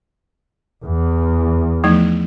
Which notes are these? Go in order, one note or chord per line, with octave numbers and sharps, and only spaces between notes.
E2
F3 A3 D#4